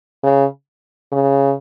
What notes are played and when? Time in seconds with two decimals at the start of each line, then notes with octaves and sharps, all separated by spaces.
0.24 C#3
1.12 C#3